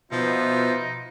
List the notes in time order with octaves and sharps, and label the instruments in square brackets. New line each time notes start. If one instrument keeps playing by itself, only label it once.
[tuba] B2 [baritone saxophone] F3 [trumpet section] B3 F4 E5 [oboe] D#4